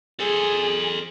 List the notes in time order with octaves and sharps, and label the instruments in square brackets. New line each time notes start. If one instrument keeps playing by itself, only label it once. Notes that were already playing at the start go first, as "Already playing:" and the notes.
[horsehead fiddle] G#4 [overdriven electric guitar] A4 C5